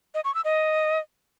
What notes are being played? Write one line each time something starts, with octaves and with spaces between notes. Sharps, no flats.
D#5
C#6
E6
D#5